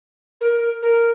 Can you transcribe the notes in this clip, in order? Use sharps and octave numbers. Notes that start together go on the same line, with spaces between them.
A#4
A#4